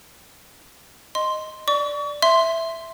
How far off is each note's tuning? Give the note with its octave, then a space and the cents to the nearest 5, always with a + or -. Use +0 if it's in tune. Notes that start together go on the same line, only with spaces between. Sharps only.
D#5 +0 C6 +0
D5 +0 C#6 +40
E5 +0 C6 +0